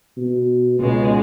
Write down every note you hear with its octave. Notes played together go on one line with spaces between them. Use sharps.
B2
C#2 B2 G#3